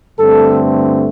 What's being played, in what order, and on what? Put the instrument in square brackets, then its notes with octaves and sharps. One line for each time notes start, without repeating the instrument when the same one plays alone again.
[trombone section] G2 D3 A3 C4 A4